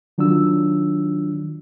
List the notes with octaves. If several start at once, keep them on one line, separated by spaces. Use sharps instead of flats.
D#3 F#3 D4 F4 E6